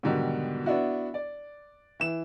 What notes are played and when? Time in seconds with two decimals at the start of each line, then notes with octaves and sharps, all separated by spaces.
0.03 G#2 B2 D3 D#3 F#3 G3
0.66 B3 D4 E4 F#4
1.14 D5
2.00 E3 E7